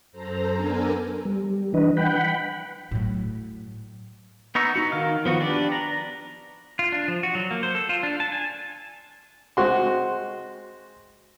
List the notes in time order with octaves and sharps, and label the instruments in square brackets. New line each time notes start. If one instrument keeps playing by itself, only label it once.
[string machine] F#2 A4 C5 A#5
B3 D4 A4 A#4 G#5
[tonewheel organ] G3
E3 D4 B4 D#5
F#5 G5 B5
[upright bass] A2 F#3
[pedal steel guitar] B3 D#4 A#5 C#6 E6
D#4 F#4
D#3 F5 F6
F3 B3 F#4
D4 G4 B4 D5
A#5
F4
D4
F3
F#4
F#3
A#3
C5
A4
F4
D4
A5
G#5
[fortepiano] G#3 C4 F#4 C6